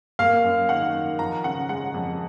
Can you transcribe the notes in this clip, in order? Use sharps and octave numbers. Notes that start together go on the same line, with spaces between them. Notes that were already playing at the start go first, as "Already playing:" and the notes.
A#3 F5
F#2
D#3 F#5
D#3
F3 A#5
C#3 F#5
G#3 F#5
F2